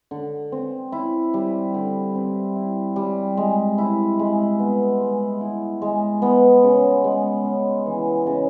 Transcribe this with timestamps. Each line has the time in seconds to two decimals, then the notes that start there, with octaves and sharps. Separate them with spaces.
0.11 D3
0.52 C4
0.92 E4
1.34 G3
1.74 D3
2.15 C4
2.56 E4
2.96 G3
3.37 G#3
3.78 E4
4.19 G#3
4.59 B3
5.00 G#3
5.41 E4
5.82 G#3
6.22 B3
6.63 C#3
7.04 G#3
7.44 C#4
7.86 E3
8.27 C#3